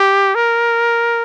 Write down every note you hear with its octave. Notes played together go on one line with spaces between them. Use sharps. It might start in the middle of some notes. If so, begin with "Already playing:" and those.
Already playing: G4
A#4